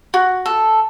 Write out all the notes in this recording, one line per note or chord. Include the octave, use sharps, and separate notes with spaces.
F#4
A4